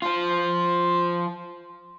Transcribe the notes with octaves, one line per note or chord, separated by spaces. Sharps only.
F3 F4